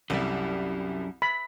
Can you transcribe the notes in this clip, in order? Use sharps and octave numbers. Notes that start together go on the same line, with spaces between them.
C2 F#2 G3 E4 G4 A4 D5
B5